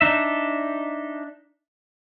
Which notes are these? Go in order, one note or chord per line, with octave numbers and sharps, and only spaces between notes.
D4 D#4 E5